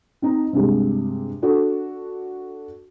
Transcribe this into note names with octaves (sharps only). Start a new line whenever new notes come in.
C4 D#4
G2 C3 G#3
D4 F#4 A4